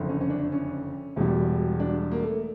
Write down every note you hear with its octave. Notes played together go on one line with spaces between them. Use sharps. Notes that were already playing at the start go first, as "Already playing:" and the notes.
Already playing: F#1 F2 D3
C#4
C#4
D4
C#4
E1 E2 B2 G3
D4
A#3
A3